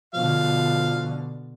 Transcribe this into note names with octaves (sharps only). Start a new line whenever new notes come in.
B2 D3 F3 F5